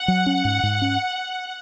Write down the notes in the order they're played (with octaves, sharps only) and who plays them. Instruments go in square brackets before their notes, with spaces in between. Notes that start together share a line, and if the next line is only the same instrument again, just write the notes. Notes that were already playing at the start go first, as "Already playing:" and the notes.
Already playing: [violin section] F#5
[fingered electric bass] F#3
C#4
G#2
G#2
C#4